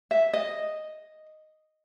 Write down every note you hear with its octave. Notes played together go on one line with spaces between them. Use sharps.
E5
D#5